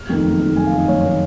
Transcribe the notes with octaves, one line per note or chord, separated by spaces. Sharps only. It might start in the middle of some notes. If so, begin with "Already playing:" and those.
Already playing: F6
F2 D#3
F#1
F2 D#3
F#1 G#5
F5
F2 D#3 D#5
F#1 C#5
D#3